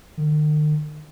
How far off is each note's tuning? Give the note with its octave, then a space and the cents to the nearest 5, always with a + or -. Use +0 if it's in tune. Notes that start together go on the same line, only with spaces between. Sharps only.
D#3 -45